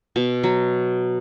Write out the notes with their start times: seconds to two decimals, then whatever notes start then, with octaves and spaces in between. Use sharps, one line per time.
0.16 B2
0.43 F#3